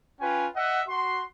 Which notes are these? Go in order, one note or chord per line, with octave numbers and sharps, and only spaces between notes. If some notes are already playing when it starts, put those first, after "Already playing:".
C#4 F4 B4 G5 G#5
D#5 E5 F#5
F#4 C6